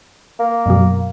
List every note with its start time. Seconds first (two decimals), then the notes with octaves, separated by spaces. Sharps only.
0.39 A#3
0.66 F#2 B2 F#3